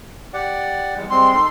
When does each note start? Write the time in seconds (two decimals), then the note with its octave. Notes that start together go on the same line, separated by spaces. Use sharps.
0.34 G4 D5 F#5
0.96 E2 G3 G#3
1.10 G3 G#3 C4 C6
1.34 D#4 A4